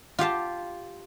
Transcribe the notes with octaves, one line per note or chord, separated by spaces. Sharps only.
F4 G4 F5 A5